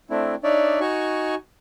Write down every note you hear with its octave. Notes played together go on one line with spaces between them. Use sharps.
A3 C4 D4 E4
D4 D#4 C#5 D5 E5
D#4 F#4 G#5 C#6